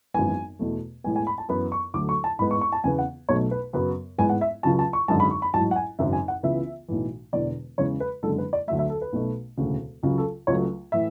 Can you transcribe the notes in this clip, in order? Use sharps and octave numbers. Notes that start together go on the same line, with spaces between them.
G#1 F#2 E3 G#3 B3 G#5
E2 B2 A3
A1 A2 G#3 B3 G#5
G#5
B5
A5
F#2 E3 B3 B5
C#6
D2 D3 F#3 A3 D6
C#6
A5
A1 G#2 G#3 B3 B5
C#6
C#6
A5
E2 C#3 E3 B3 G#5
F#5
B1 B2 F#3 A3 C#5
B4
F#2 C#3 F#3 B3 B4
A1 G#2 G#3 B3 G#5
F#5
E5
C#2 C#3 F#3 A5
A5
C#6
G#1 F#2 D3 G#3 A5
B5
C#6
B5
A1 G#2 F#3 A5
F#5
G#5
G#1 F#2 C#3 E5
G#5
F#5
C#2 C#3 E3 B3 E5
B1 A2 E3
E1 E2 D3 D5
E2 C#3 G#3 C#5
B4
F#1 F#2 D3 G#3 A4
B4
D5
D2 D3 F#3 A3 E5
E5
A4
B4
B1 B2 A3
E1 D2 C#3
C#2 C#3 F#3
A4
C#2 C#3 F#3 A3 C#5
A2 E3 E5